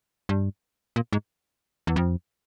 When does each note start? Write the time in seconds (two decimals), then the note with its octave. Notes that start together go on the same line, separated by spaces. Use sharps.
0.29 G2
0.96 A#2
1.13 G#2
1.87 E2
1.96 F2